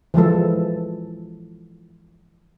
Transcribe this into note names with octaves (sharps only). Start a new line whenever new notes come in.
E3 F3 G#3 A4